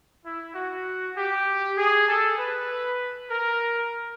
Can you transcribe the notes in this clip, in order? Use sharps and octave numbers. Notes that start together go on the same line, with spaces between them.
E4
F#4
G4
G#4
A4
B4
A#4